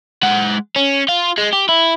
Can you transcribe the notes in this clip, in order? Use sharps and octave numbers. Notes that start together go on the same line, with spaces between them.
G#3 F#5
C#4
F4
G#3
G4
E4